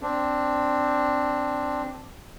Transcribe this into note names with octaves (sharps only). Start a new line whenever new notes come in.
C4 D4